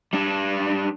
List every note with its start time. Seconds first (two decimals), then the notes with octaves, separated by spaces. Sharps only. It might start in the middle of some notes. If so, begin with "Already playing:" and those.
0.13 G3 D4